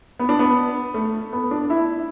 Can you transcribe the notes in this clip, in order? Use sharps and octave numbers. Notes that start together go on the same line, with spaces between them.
B3
D4
B3
A3
B3
D4
E4